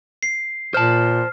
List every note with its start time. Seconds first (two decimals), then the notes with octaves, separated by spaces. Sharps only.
0.23 C7
0.74 A#2 C5 A5 F6